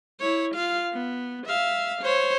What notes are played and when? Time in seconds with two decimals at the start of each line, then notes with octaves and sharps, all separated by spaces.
0.20 E4 C#5
0.55 F4 F5
0.93 B3
1.46 E5 F5
2.02 C5 C#5